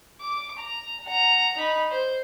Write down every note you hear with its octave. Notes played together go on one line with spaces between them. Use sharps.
D6
A#5
F#5 A#5
D#4 B5
C5